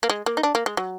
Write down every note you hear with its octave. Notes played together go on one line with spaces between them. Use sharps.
A#3
G#3
A#3
D#4
D4
A#3
G#3
F#3